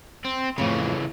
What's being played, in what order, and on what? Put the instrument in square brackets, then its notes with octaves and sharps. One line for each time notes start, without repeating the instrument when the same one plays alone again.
[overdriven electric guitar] C4
[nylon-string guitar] F2 A2 [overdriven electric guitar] C#3 E3